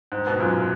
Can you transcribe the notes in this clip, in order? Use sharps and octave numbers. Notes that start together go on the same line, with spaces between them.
G#2
G#2 B2
F#2 A#2
A#2